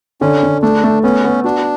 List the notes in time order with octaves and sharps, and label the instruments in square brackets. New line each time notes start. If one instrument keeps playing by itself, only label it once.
[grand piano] D3 [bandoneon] C#4
[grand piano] D3
[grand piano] A3 [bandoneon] D4
[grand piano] A3
[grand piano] B3 [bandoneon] C#4
[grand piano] B3
[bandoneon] D4 [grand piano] F#4